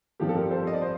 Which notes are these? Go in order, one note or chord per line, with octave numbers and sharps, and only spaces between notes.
G2 F3 C4 G4
A4
G4 A#4
A4 C5
D#5
D5
C5